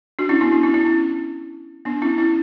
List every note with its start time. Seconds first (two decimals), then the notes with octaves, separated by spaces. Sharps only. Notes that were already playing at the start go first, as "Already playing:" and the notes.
0.19 D4 F#4
0.29 C#4 E4
0.41 B3 D4
0.52 B3 D4
0.63 C#4 E4
0.74 C#4 E4
0.85 C#4
1.85 B3 D4
2.02 C#4 E4
2.18 C#4 E4